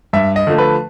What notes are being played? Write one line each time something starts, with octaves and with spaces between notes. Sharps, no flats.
G2 E5
D#5
D3 F3 A3
B4